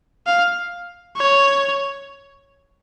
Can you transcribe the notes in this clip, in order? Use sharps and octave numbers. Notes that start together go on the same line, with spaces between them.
F5
C#5